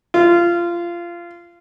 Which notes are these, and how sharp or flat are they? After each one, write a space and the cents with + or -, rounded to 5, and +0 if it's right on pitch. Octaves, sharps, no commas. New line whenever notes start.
F4 -20